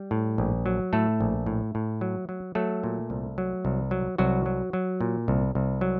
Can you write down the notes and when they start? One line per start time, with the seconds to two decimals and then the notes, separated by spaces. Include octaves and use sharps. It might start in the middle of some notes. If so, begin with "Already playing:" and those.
Already playing: G3
0.11 A2
0.38 A#1
0.66 F#3
0.93 A2 A3 A4
1.20 A#1
1.46 A2
1.75 A2
2.01 F#3
2.29 F#3
2.55 F#3 A3 A4
2.84 A#2
3.10 C2
3.38 F#3
3.65 C2
3.91 F#3
4.18 C2 F#3 F#4
4.46 F#3
4.73 F#3
5.01 A#2
5.28 C2
5.55 C2
5.81 F#3